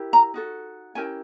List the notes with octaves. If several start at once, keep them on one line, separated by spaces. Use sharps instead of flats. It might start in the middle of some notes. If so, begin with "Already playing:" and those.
Already playing: E4 G4 A#4
A#5
D#4 F#4 A4
C#4 E4 G4 A#4 G#5